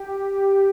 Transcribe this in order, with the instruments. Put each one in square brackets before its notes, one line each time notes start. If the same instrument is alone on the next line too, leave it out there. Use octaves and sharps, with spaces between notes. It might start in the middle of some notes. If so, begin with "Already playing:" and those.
Already playing: [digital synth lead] G4